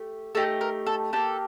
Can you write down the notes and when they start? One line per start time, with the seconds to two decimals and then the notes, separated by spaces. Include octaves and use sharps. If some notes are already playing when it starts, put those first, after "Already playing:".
Already playing: A3 G4
0.35 A3 D#4 G4 A4
0.61 A#4
0.86 A4
1.13 A#3 D4 G4 A4